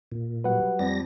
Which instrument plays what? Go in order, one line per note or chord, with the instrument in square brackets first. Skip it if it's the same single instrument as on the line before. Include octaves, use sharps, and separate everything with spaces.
[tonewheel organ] A#2
[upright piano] F#3 G3 [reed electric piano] B4 F#5
[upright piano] F2 [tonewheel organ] G3 A#6